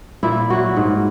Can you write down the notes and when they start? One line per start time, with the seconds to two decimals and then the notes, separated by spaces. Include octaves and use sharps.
0.23 A#2 E4
0.50 F#3 F#4
0.76 G#2